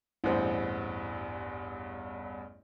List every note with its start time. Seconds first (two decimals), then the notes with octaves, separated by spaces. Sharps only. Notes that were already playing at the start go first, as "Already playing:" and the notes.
0.24 A1 E2 G2 E4 C5